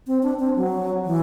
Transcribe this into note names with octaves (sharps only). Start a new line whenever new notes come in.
C4
D4
C4
F#3
E3